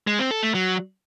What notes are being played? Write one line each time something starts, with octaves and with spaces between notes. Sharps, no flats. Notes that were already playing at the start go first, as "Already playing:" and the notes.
G#3
C4
A4
A3
F#3